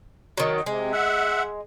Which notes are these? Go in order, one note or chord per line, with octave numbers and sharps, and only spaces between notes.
D#3 F#3
C3 G#3
E5 F#5